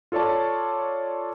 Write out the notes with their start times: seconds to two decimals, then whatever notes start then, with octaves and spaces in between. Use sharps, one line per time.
0.12 F4 A4 C#5 D5 A5